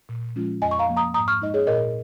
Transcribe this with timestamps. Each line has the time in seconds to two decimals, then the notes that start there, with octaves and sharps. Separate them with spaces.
0.09 A#2
0.35 F3 G#3 C#4 F4
0.62 F2 D#5 G#5
0.71 C#6
0.79 F5 A#5
0.88 F3 A#3
0.97 A#5 D#6
1.14 G#2 A#5 D#6
1.28 C#6 F6
1.40 G#3 D#4 D#5
1.54 G#4 C#5
1.67 A#2 A#4 D#5